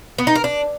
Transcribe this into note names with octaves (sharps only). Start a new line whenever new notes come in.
B3
D#4
A#4
D4